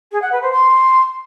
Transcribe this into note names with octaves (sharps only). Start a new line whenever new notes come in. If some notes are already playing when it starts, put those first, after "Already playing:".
G#4
F#5
B4
C5
C6